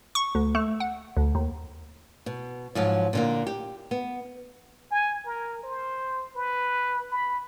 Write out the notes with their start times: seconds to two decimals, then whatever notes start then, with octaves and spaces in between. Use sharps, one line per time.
0.15 C#6
0.35 D2
0.55 A3
0.80 F#5
1.17 D2
1.35 D#2
2.26 B2
2.75 G#2 F3 F#3
3.13 A#2 D3 A#3
3.47 G4
3.91 B3
4.91 G#5
5.26 A#4
5.64 C5
6.36 B4
7.11 B5